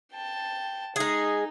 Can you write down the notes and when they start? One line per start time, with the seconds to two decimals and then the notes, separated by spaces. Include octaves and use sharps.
0.13 G5 A5
0.96 G#3 D#4 G#4